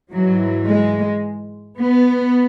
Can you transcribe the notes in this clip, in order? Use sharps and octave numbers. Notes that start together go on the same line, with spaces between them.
G#2 E3 F#3
G#3
B3